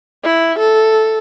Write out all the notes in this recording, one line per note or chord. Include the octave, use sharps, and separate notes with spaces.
E4
A4